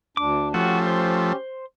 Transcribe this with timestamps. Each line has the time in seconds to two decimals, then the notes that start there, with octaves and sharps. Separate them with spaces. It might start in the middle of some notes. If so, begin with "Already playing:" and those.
0.17 D2 D4 D6
0.54 F3 A3 C#4 F#4 G4
0.87 C5